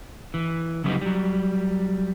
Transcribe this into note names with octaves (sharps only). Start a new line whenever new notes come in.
E3
C#3 F#3 G3 B3 D4 D#4
F#3 G3